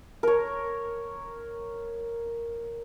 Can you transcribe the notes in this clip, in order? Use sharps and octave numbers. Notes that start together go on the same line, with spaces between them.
A#4 C#5